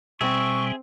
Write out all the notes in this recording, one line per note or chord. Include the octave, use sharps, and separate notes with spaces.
B2 G3 C4 G#4 E5 C#6